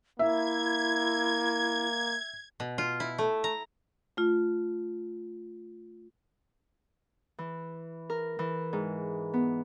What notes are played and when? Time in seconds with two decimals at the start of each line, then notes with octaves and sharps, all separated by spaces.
0.19 A#3 E4 E5 G#6
2.60 B2
2.78 F4
3.00 E4
3.18 A3
3.44 A#5
4.17 A3 F4
7.38 E3
8.10 A#4
8.39 E3
8.73 G#2
9.33 B3